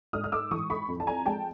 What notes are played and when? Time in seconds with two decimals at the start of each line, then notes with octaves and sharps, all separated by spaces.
0.13 G#2 D#6 F6
0.24 F6
0.32 D6 E6
0.51 E3 C#6 D#6
0.70 B5 C#6
0.88 F2
1.00 A5
1.07 G#5 A#5
1.26 G#3 G5 A5